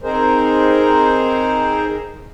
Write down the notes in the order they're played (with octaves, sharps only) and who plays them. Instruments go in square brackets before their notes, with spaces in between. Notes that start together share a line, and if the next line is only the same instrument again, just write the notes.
[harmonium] C4 D#4 G#4 A#4 C5